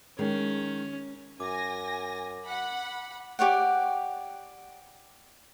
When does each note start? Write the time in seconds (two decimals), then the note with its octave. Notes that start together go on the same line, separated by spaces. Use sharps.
0.19 D#3 G#3 C#4
1.40 F#2 G#5 D6 A#6
2.45 F#5 B5
3.39 G4 C#5 D5 F#5